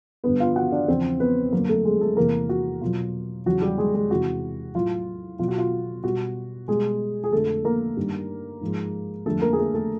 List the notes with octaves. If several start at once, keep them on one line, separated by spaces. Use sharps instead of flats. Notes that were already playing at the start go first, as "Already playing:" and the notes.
G2 D3 G3 B3 B4
F4 F5
F#4 F#5
D4 D5
E2 C#3 F3 C4 C5
B3 B4
F#2 D3 F#3 A#3 A#4
A3 A4
G#3 G#4
A3 A4
E2 C3 E3 A#3 A#4
F#4
B2 F#3 F4
E2 C#3 F#3 F#4
G3 G4
G#3 G#4
G#3 G#4
E2 C3 E3 F#4
A2 F#3 F4
B2 F#3 F4
F#4
F4
B2 G3 F#4
B2 G3 G#3 G#4
G#4
F2 D3 F3 G#3 A3 A4
A#3 A#4
G2 D#3 G3
G#2 F3 G#3
F2 D3 G3 A3 A4
A#3 A#4
G#4
A3 A4
A3 A4